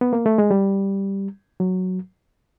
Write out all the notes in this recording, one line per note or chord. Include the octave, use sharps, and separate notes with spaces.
B3
A#3
A3
G#3
G3
F#3